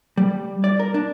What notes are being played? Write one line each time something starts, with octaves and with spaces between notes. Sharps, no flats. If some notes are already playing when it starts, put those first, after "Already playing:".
G3
D5
A#4
D4